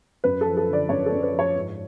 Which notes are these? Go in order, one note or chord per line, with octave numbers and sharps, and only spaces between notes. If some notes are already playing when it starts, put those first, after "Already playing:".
F#2 B4
F3 A4
A4
D3 D5
F#2 C#5
A4
F#2
B4
F3
C#5
G#2